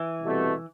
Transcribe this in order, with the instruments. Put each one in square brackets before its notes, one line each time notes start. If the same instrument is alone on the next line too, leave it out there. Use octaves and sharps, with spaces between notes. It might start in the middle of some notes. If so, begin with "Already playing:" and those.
Already playing: [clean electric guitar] E3
[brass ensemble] C2 B2 A3